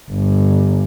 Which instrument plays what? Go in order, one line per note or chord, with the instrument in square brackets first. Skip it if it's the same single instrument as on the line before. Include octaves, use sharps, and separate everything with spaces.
[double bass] G1